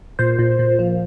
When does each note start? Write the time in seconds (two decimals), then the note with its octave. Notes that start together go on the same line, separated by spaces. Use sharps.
0.19 A#2 C5
0.39 A#2
0.59 A#2
0.79 F3